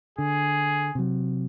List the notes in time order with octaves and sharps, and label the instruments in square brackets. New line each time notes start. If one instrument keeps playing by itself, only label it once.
[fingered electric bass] D3 [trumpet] G#4
[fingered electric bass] C3 F#3